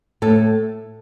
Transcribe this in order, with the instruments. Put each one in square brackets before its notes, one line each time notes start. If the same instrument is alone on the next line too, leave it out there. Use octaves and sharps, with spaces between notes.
[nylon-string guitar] A2 A4